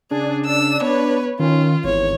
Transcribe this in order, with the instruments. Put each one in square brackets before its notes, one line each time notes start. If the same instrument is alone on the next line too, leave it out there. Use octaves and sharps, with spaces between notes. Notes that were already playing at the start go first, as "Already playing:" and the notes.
[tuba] C#3 [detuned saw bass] D4 [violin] G#4
[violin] E6
[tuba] B3 [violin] B4 C#5
[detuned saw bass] D#3 [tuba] C#4 [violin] F4
[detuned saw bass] G#1 [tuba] E2 [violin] C#5